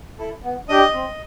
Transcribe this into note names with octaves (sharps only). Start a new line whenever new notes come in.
E4 A4
B3
D4 G4 D#5 D#6
C4